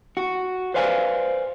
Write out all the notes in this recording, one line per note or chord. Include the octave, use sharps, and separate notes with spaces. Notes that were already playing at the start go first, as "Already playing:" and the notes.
F#4
B4 C5 D5 F5 G#5